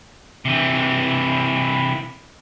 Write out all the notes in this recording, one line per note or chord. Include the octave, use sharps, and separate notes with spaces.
C3 E3